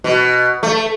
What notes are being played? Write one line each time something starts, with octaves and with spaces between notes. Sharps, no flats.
B2
A3